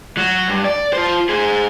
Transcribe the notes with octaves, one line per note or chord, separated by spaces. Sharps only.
F#3 F#4
G2
D5
F4 C5
G#4 C5